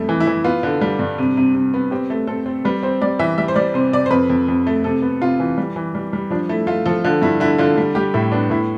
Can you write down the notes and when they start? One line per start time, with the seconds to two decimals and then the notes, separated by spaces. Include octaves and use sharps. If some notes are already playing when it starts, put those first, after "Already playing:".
Already playing: F2 G3 A3
0.09 E3
0.20 E4
0.27 E3
0.44 B3 F4
0.63 D3
0.81 G3
0.99 G2
1.18 C3
1.37 C3
1.55 C3
1.74 B3
1.91 C4 G4
2.10 A3
2.27 C4 A4
2.46 C4
2.65 G3 B4
2.83 C4 C5
3.02 G3 D5
3.19 E3 E5
3.38 G3 E5
3.48 C5
3.56 G3 D5
3.74 C3 C5
3.93 C3 D5
4.06 C5
4.11 F2 B4
4.30 F2
4.48 F2
4.67 A3
4.84 C3 A4
5.02 B3
5.21 C3 F4
5.40 E3
5.58 G3
5.76 E3
5.95 G3
6.13 G3
6.30 F3 D4
6.49 A3 E4
6.67 A3 F4
6.86 F3 A4
7.04 D3 F4
7.22 G2 E4
7.40 D3 E4
7.58 D3 F4
7.78 G3
7.95 G3 G4
8.14 A2 E4
8.32 B3 D4
8.50 A2 E4